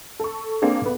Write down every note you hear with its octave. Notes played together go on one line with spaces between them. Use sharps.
A4 C#6
A#3 C4 D4 G#4
B1 B3